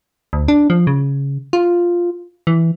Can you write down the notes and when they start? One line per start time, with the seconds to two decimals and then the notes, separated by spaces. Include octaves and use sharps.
0.33 D2
0.48 D4
0.70 F3
0.87 C#3
1.53 F4
2.47 E3